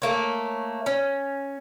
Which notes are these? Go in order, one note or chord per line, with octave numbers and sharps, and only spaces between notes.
A3 A#3 C#5
C#4